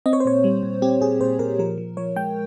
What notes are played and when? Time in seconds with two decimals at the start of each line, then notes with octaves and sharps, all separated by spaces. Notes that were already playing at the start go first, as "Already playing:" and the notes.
0.06 C4 D#5
0.13 C#5
0.20 C5
0.25 A#2 C#5
0.44 G3
0.63 A#2
0.82 C4 G4
1.01 A#2 G#4
1.21 A#2 C5
1.39 A#2 A#4
1.59 F3 A#4
1.78 F3
1.97 F3 C#5
2.16 G#3 G5